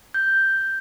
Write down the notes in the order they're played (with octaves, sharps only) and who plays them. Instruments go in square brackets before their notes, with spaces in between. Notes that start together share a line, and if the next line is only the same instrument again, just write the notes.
[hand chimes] G6